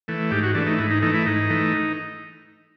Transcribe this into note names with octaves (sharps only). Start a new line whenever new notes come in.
E3 A3
G#2 G4
F#4
E3 A3 D4
D#4
G#2 E4
D#4
E3 A3 D#4
E4
G#2 D#4
E3 A3